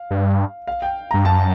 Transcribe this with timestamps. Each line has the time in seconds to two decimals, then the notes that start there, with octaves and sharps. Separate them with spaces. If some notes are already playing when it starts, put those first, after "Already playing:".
Already playing: F5
0.11 G2
0.67 F5
0.82 G5
1.11 G2 A#5
1.25 F#2 A5